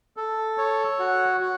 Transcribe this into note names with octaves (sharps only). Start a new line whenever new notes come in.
A4
C#5
F#4
F#4